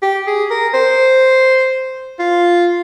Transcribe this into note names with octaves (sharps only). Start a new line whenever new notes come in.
G4
G#4
A#4
C5
F4